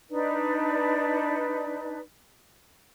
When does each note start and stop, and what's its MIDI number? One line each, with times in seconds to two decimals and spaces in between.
0.10 1.98 62
0.10 1.98 63
0.10 1.98 71
0.10 1.98 74